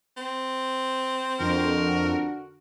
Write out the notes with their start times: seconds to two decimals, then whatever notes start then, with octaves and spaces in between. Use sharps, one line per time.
0.17 C4
1.39 F2 D3 F#4 A#4